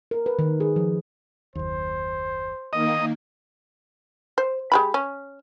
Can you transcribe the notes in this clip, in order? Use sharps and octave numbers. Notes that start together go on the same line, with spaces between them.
A#4
B4
D#3
G#4
F3
F#1 D#2 C5
D#3 A#3 D#5
C5
G#3 G4 B5
C#4